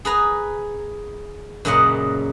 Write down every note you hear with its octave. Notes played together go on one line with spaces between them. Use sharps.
G#4 B4 A#5
F#2 A#2 C#3 D#5 F#5